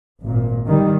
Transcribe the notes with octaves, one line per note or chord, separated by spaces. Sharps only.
G#1 A#2
D#3 G3